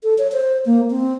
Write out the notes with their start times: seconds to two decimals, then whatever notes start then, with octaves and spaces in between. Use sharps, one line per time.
0.03 A4
0.18 C#5
0.32 C5
0.66 A#3
0.91 C4